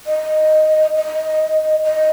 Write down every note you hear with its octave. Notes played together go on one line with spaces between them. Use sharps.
D#5
D#5
D#5